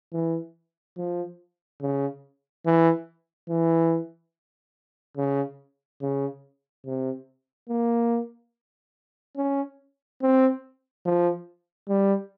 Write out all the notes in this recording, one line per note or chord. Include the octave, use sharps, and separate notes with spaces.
E3
F3
C#3
E3
E3
C#3
C#3
C3
A#3
C#4
C4
F3
G3